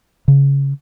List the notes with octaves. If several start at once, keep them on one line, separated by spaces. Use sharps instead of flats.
C#3